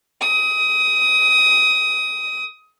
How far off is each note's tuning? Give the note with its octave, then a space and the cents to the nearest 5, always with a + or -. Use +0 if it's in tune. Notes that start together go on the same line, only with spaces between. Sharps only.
D#6 +20